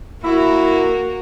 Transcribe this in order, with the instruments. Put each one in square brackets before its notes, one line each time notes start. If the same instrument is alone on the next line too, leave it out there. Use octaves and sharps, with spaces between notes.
[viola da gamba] A#3 F#4 A#4 [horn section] E4